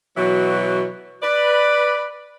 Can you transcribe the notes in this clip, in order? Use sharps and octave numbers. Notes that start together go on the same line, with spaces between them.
B2 E3 F#3
B4 D5